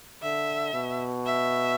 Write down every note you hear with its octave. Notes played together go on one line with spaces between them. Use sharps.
D3 E5
B2
E5